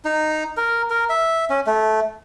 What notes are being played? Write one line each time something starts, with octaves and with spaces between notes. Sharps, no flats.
D#4
A#4
A#4
E5
C#4
A3